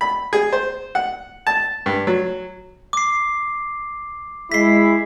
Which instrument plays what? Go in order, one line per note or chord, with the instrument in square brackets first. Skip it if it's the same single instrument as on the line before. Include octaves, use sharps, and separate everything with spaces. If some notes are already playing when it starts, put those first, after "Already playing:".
[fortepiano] B5
G#4
C5
F#5
A5
G2
F#3
[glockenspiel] D6 C7
[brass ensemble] G#3 E4 [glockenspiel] B6 C7